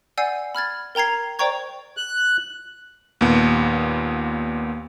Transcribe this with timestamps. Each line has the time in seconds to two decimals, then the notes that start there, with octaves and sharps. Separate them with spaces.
0.17 D5 F#5 G#5 E6 G6 C7
0.55 B5 F6 G#6 A6
0.95 A#4 G5 A#5 G#6 C7
1.39 C5 D5 G5 A#5 C#6 G#6
1.97 F#6
3.21 D#2 A#2 B3